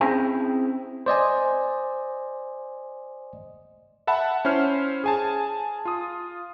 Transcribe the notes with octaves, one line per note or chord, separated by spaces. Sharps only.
C4 C#4 E4 G#4 C5 G5
C5 D5 D#5 G#5
E5 F#5 A5 B5
C#4 E4 C5 F6
G#4 G#5 A5
F4 D#6